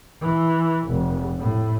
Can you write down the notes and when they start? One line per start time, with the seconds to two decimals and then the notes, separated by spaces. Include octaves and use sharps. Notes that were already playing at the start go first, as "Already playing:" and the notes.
0.21 E3
0.89 F1
1.39 A2